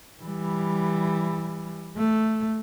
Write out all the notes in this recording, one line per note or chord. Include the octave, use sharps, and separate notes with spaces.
E3 G3
A3